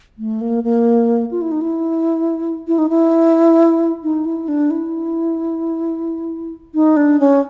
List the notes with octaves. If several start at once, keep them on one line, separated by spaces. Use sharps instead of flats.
A3
A#3
A#3
F4
E4
D#4
E4
E4
D#4
E4
D#4
E4
D4
E4
D#4
D4
C#4